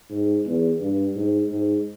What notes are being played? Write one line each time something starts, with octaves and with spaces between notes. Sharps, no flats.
G#2
E2
G2
G#2
G#2